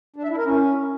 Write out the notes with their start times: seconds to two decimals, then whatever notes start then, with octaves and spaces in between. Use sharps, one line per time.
0.16 D4
0.23 E5
0.31 E4
0.38 A#4
0.45 C#4